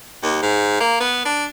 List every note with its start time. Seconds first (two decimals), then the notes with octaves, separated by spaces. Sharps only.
0.22 D#2
0.42 G#2
0.80 A#3
1.00 B3
1.25 D4